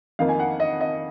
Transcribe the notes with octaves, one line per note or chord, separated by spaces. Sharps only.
F2 D#3 A#3 F5
G#5
F#5
D#5
D#5